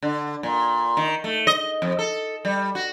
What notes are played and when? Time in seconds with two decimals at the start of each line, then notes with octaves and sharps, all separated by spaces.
0.02 D3
0.43 A#2
0.97 D#3
1.24 A3
1.47 D#5
1.82 F2
1.99 A4
2.45 G3
2.75 F#4